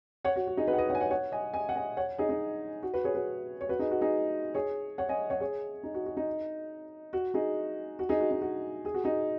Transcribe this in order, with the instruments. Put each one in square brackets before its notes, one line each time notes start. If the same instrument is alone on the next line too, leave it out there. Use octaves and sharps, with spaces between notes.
[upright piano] C#5 F#5
F#4
F#4
D#4 G#4
F#4 B4
F#5
B4 D#5
C#5 F#5
G#5
C#5 F#5
C#5 F#5
D#5 G#5
D#5 G#5
F#5
D#5 G#5
C#5 F#5
D#4 G#4
D#4
F#4
F#4 B4
G#4 C#5
F#4 B4
C#5
F#4 B4
D#4 G#4
F#4
D#4 G#4
G#4 C#5
C#5 F#5
D#5 G#5
C#5 F#5
G#4 C#5
D#4
F#4
F#4
D#4
F#4
D#4 G#4
F#4
D#4 G#4
F#4
D#4
F#4
G#4
F#4
D#4 G#4